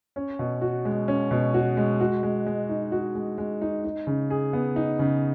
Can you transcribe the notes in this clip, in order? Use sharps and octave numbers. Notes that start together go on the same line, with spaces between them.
C#4
B2
F#4
G#3
C#4
B2
F#4
G#3
F#4
G#3
G#3
D#4
F#4
G#3
G#3
D#4
D#4
C#3
G#4
B3
D#4
C#3